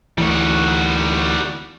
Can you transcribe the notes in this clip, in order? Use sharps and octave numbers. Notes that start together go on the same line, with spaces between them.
D2 E3 G3 F#4